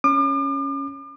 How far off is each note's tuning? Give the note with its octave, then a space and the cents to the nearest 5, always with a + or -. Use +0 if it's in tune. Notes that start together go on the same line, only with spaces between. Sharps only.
C#4 +0 D6 +40